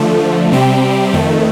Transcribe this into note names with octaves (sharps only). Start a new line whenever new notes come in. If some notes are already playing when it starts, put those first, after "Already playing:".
Already playing: D3 F3 A3
C3 G3 C4 G4
F2 D#3 A3